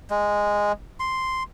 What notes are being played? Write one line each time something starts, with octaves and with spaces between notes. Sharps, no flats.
G#3
C6